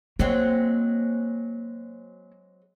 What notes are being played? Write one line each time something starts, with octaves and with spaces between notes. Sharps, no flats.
F#3 G#3 A#3 C4